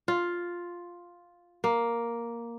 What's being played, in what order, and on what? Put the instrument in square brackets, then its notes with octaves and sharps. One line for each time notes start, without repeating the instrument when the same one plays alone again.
[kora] F4
A#3